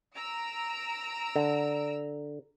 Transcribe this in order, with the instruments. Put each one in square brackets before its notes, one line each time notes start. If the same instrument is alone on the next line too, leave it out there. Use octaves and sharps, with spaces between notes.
[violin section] A#5 E6 D7
[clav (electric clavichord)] D3